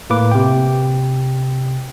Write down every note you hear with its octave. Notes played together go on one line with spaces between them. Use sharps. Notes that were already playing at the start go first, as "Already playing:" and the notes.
A2 A#3 B4 D6
C3 G5